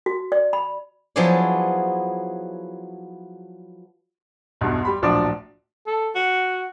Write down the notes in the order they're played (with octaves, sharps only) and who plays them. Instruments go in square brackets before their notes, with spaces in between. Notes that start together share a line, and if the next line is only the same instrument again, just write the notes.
[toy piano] F#4
D5
B5
[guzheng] F3 F#3 B3 E4 G#4 D5
[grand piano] B1 E2 G2 B2
G3 B5 C6
D1 A#1 F3 F#3 D4 D5
[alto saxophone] A4
F#4